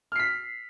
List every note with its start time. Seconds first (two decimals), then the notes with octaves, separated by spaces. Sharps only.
0.12 F6
0.16 C7
0.19 B6